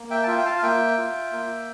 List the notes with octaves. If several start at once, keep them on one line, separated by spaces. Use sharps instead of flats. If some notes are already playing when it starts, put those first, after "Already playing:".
Already playing: A#3
E5 G5
A5
F4 E5 G5
G5
F5 A5
F5
A#3 E5 G5
F4
A#3